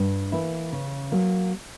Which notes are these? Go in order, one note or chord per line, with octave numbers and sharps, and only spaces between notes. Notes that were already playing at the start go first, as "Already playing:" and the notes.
Already playing: G2
E3 A#3 E4
C#3
F#3 A#3